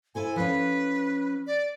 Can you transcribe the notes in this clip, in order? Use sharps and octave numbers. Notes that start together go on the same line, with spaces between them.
E4 A4 C5 G#5
F3 C#4 B4
D5